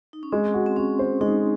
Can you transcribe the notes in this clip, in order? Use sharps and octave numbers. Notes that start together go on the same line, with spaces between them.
D#4
C#4
G#3 C4
F#4
C4
C#4 F#4
C5
G#3 D#4